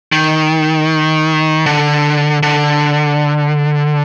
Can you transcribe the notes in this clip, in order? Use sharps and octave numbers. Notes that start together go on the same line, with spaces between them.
D#3
D3
D3